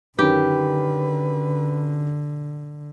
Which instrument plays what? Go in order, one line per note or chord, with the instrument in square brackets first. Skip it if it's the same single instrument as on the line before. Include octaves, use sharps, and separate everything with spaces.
[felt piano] F#2 D#3 [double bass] D3 [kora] G4 [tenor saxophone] B4